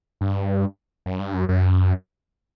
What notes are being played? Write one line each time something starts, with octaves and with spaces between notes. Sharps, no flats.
G2
F#2
G2
F#2
F#2